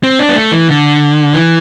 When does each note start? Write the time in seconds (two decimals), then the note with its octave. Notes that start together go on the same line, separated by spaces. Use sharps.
0.03 C4
0.19 D4
0.29 B3
0.36 A3
0.52 E3
0.69 D3
1.33 E3